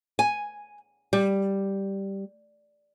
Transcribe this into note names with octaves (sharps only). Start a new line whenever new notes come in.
G#5
G3